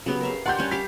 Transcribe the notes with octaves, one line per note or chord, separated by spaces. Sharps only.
C#3 F#3 B3 G4
A#4 E5 F5
D4 G4 D5 F#5 C6 G6
G3 C#4
G4 F5 D6 B6